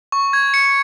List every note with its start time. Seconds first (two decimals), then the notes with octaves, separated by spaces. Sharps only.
0.12 C#6
0.33 G#6
0.54 C#7